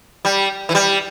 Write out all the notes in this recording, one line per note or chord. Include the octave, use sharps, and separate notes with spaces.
G3
E3
G3